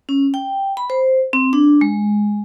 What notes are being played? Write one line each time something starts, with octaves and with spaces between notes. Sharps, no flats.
C#4
G5
B5
C5
C4
D4
G#3